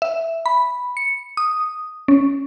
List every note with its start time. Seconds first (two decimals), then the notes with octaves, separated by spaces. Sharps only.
0.02 E5
0.46 B5
0.97 C#7
1.37 D#6
2.08 C#4